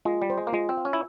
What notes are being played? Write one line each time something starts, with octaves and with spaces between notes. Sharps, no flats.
G#3 F4
G3
C5
G#3
A#3
G#3 F4
C4
F5
C#4
E4